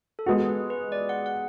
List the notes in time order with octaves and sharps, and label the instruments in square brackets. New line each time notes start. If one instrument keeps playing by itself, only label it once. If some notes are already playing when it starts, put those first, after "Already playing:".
[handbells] A4
[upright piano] G#3 B3 F#4 [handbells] G#4
[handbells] B4
B4
D5
F#5
F#5